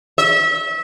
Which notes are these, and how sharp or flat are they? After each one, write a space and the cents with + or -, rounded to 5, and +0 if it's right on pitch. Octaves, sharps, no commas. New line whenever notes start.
E5 -30